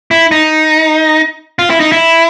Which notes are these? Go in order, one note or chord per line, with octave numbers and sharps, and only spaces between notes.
E4
D#4
F4
E4
D#4
E4